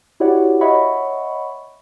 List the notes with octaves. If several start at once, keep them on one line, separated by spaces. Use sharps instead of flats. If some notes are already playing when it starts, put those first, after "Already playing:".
E4 F#4 G4 C#5 D5 F#5
C#5 D#5 E5 F#5 B5 C#6